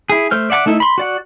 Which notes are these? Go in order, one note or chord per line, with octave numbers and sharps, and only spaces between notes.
E4 G#4
A3 C5 F6
D5 E5 F#5 G#5 D6
A3 D#4 E4 A4
B5 C6
F#4 D5 F#5